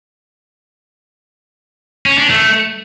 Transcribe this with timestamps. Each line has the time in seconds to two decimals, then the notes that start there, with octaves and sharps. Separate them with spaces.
2.06 C#4
2.18 D4
2.30 A3